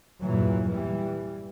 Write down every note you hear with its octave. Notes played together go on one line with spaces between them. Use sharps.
E2 G2 A#2 E3 F#3
E3 G3